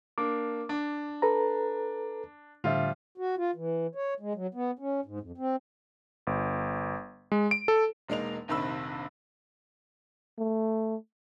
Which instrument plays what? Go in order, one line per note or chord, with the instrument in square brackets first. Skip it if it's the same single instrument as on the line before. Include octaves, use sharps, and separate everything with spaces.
[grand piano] A#3 D4 [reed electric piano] D6
[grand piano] D4
[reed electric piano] A4 B4 A#5
[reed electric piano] A2 D3 E5 [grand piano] F3 G3 F4
[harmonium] F#4
F4
E3
C#5
G#3
F#3
B3
C#4
G#2
F2
C4
[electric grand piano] G1
G#3
D7
A4
[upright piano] E1 G#3 A#3 D#4 F7
F1 A#1 C3 D#3 B5 E6
[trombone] A3